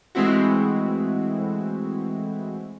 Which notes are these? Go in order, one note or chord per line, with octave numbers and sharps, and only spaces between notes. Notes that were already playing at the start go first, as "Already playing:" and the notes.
E3 G#3 A3 C4 E4 F#4